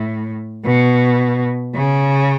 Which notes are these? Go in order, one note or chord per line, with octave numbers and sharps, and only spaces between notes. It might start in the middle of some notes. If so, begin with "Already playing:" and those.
Already playing: A2
B2
C#3